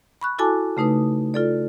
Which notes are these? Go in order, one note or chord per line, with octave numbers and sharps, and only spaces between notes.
B5 C#6 F#6
E4 F#4 A4 G#5 A5 D6
C#3 A3 D#4 B4 D#6
F4 A4 D5